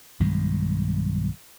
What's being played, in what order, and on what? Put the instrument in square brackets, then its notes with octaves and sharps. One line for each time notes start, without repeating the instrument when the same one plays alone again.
[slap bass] B1 G2 D#3 G#3